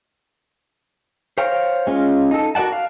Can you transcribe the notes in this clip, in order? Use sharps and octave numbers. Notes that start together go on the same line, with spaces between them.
C5 C#5 F5 G5 A#5
G#3 C#4 F4
D#4 A4
F#4 A#4 D5 F#5 A5
F5